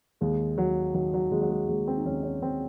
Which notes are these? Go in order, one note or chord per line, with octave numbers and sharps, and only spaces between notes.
D#2 G#3
D#2 F#3
D#3 F#3
F#3
D#2 G#3
F#3
G#3
D#2 G#3
C4
D#4
D#2 C#4
C#4
D#3 C4